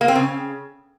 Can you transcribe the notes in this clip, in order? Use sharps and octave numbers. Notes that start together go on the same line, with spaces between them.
A#3
C4
C#3